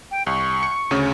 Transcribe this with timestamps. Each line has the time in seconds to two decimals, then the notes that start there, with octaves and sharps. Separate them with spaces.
0.11 G5
0.27 C2 C#6
0.63 C#7
0.91 D2 C#3 C#4